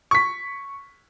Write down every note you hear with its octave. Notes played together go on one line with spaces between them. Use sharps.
C#6 B6